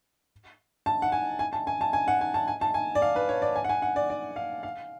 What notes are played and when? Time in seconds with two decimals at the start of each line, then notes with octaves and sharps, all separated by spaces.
0.86 A5
1.02 F#5
1.12 G#5
1.39 G#5
1.53 A5
1.67 G#5
1.81 A5
1.93 G#5
2.08 F#5
2.21 G#5
2.34 A5
2.48 G#5
2.61 A5
2.74 G#5
2.95 D5
3.02 F5
3.16 B4
3.29 C#5
3.42 D5
3.56 G#5
3.64 F#5
3.69 G#5
3.82 F#5
3.96 D5
4.10 D5
4.36 F5
4.63 F5